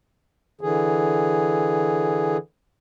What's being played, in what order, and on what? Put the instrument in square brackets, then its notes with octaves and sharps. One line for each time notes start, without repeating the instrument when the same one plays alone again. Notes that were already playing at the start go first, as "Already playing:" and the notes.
[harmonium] D3 E3 G#4